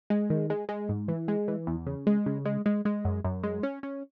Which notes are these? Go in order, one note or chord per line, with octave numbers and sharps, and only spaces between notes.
G#3
D#3
G#3
G#3
G#2
E3
G#3
E3
E2
C#3
G#3
C#3
G#3
G#3
G#3
F#2
F#2
G#3
C#4
C#4